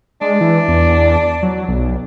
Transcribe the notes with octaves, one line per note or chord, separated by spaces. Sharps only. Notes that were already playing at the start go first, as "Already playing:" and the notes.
G#3 D4
E3
E2
F#3
B1